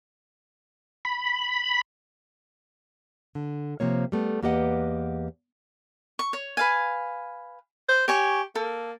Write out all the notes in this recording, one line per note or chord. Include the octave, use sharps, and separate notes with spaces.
B5
D3
C3 F3 A#3 C#5
G3 A3 B3
E2 A#3 G4 B4 D#5 F#5
C#6
C#5
B4 F5 G#5
C5
G4 C#5 G#5 C#6
A#3 A4